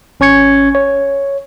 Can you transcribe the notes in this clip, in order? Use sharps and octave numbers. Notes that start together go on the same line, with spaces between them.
G#1 C#4 C#6 G#6 C#7
C#5